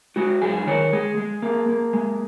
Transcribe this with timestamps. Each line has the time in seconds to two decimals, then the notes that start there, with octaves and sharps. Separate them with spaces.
0.16 G#3 F#4
0.41 F#2 G#4
0.66 D#3 C#5
0.93 G#3 G#4
1.17 G#3
1.42 A#3
1.69 A#3
1.93 G#3